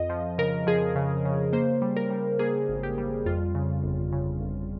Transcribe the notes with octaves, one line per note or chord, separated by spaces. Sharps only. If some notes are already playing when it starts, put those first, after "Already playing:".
Already playing: F2 D#5
F3
C#3 A#4
F3 G#4
C#3
C#3
A#3 C5
G3
A#4
G3
A#3 G#4
G#1
G4
G3
F2 F4
C#3
G1
C#3
G1